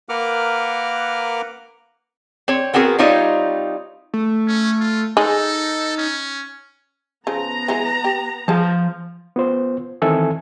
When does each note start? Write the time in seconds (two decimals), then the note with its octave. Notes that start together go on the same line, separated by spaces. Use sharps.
0.09 A#3 A#4 B4 F#5 D6 F6
2.48 C4 C#5
2.74 B3 C4 F#4 G#4 A#4
2.99 G3 C4 D#4 F4 C#5 D#5
4.14 A3
4.47 C#4
4.80 F4
5.17 G#3 D#4 A4
5.98 C#4
7.27 C#3 F3 B3 A#5
7.68 E3 F#3 G#3
8.04 G4
8.48 F3 G#4 F5 A5
9.36 B3 F4 C5
10.02 D#3 E3 C4 A4 E5 G#5